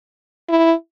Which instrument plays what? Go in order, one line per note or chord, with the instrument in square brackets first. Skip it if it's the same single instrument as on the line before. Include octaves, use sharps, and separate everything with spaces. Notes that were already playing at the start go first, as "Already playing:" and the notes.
[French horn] E4